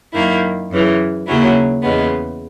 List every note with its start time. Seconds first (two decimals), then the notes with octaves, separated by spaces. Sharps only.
0.13 F#2 D#3 A#3 E4
0.70 F#2 C#3 E3
1.27 D#2 C#3 F#3 C#4 E4
1.82 E2 C#3 G#3 B3